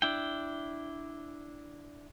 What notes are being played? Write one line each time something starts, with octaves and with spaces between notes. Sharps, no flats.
D4 E4 G5